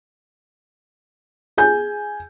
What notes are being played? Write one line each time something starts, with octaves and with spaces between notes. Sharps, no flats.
G#4 G#5 G6